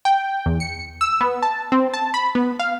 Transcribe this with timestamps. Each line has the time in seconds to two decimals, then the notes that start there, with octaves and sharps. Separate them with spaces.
0.05 G5
0.46 E2
0.60 C#7
1.01 E6
1.21 B3
1.43 A5
1.72 C4
1.94 A5
2.14 B5
2.35 B3
2.59 F5